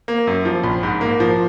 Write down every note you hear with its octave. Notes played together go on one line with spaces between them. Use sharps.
A#3
F#2
F3
A#1
G#2
A#3
F3